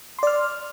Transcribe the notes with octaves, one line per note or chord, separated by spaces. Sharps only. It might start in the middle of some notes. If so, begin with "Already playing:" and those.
D5 C6 F6